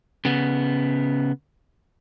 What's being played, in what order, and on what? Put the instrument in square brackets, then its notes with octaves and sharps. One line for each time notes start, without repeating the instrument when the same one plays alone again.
[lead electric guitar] C#3 B3